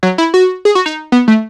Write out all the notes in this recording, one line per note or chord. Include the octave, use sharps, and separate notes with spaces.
F#3
E4
F#4
G#4
F#4
D#4
B3
A3